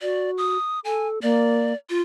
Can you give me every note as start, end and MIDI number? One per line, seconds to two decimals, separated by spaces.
0.01 0.57 66
0.01 0.30 74
0.38 0.80 87
0.85 1.19 69
0.85 1.08 80
1.22 1.73 58
1.22 1.76 74
1.90 2.01 65